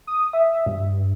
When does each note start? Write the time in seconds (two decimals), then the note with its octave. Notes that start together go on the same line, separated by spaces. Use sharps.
0.07 D#6
0.33 E5
0.66 G2